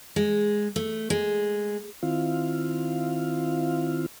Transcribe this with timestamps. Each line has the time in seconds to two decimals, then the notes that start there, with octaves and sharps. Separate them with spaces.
0.16 G#3
0.76 A3
1.10 G#3
2.03 D#3 C4 E4 F4 F5